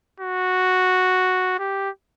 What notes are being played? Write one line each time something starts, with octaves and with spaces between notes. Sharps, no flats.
F#4
G4